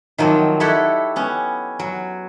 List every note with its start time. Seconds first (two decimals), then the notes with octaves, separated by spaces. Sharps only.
0.18 D#3 F3 F#3 A#3 C4
0.60 E4 G4 A4 C#5 E5 F#5
1.16 B3 C#4
1.79 F#3